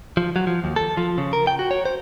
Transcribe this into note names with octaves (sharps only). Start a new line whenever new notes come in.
F3
F#3
F3
D#2
A4
F3
C#3
A#4
G5
F#4
C#5
C5